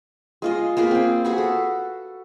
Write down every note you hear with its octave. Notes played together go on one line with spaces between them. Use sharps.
G#3 F4 D#5
A#3 F4 G#4 B4
C4 G5
F#4 G#4 B4
A4